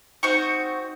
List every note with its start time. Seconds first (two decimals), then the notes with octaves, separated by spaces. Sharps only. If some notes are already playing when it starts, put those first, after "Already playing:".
0.23 C4 D#4 F#4 C#6